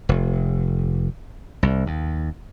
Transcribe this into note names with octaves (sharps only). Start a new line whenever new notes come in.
F1
C2
D#2